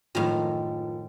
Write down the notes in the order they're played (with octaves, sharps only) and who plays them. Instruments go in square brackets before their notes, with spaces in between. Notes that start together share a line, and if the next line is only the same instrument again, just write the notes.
[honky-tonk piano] F#1 F3 [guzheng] A2 D#3